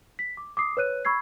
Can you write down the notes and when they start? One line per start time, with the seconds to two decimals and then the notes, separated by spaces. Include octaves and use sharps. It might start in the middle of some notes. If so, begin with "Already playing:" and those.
0.19 B6
0.37 D6
0.57 D6 D#6 C7
0.77 B4 C#5 F#6 D#7
1.05 B5 C#6 E6 G#6 C7